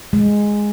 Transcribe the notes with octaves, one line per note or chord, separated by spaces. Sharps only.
G#3